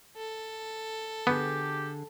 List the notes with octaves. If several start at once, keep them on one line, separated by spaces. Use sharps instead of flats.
A4
D3 B3 G4 G#4